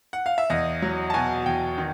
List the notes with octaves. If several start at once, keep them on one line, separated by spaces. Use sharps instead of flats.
F#5
F5
E5
E2 D#5
F#3
A5
B2 G#5
E2 G5
D#3